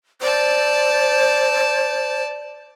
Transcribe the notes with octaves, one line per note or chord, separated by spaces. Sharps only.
C5 D5 A5